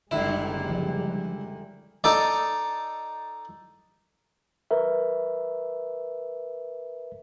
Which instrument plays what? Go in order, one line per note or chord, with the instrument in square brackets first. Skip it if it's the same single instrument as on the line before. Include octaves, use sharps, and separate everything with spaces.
[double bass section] F#1 G3 G#3 [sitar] A#2 D3 D#3 [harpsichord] E4
[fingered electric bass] F3
[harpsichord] D#4 A4 D5
[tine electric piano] A#4 B4 E5